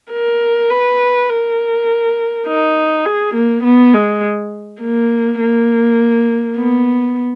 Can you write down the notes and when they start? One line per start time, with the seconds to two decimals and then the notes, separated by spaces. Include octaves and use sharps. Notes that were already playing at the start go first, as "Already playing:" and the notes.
0.12 A#4
0.71 B4
1.30 A#4
2.47 D#4
3.06 G#4
3.35 A#3
3.64 B3
3.93 G#3
4.81 A#3
5.40 A#3
6.58 B3